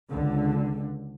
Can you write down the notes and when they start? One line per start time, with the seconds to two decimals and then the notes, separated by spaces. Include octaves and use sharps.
0.10 C#2 D3